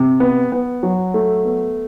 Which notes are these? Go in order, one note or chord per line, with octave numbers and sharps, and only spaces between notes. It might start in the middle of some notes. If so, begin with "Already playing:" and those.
Already playing: C3
B3
B3
F#3
A3
B3